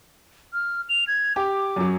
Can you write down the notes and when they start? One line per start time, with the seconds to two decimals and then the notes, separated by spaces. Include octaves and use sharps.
0.53 F6
0.89 F7
1.08 G#6
1.36 G4 D6
1.76 F#2 F#3